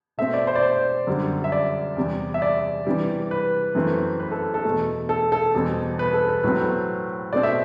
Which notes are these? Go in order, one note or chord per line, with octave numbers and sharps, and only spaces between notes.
B2 A3 C4 E5
D5
C5
D5
C5
F#2 D3 G3
E5
D5
E2 C3 G3
E5
D5
C3 E3 G3
B4
F#2 E3 A3 C4
B4
A4
A4
E2 B2 A3
A4
A4
E2 B2 G3 C4
B4
A4
B4
A2 F#3 A3 C4 B4
B2 A3 C4 D5
E5